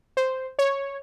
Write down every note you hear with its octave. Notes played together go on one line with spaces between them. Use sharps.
C5
C#5